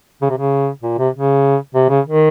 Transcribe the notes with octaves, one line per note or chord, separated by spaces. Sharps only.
C#3
C3
C#3
A#2
C3
C#3
C3
C#3
D#3